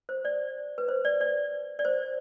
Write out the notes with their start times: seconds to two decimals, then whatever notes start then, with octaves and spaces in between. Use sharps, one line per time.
0.09 C5
0.25 D5
0.78 B4
0.88 C5
1.05 D5
1.21 D5
1.79 D5
1.85 C5